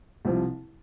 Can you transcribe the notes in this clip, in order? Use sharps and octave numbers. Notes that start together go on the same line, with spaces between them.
C2 C3 F3